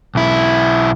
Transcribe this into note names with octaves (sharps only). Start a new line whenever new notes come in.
B1 E4